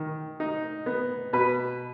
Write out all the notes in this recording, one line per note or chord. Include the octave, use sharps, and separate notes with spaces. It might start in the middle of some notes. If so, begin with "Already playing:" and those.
Already playing: D#3
D#4
B3
B2 B4